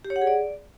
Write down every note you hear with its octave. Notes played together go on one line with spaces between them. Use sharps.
G4
C#5
F#5
G#4
D5